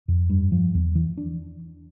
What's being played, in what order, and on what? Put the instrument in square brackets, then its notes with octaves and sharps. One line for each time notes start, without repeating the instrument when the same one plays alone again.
[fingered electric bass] F2
G2
F3
E2
E3
D4